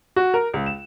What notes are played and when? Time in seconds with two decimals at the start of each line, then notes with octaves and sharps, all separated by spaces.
0.16 F#4
0.34 A#4
0.54 C#2
0.66 E7